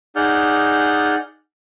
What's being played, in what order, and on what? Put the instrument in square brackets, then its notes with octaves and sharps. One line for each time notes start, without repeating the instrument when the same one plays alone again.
[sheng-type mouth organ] D#4 G#4 D5 F#5 F6 G6